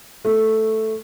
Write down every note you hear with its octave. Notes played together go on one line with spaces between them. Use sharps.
A3